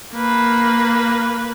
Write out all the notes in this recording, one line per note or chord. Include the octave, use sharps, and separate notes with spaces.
A#3 B4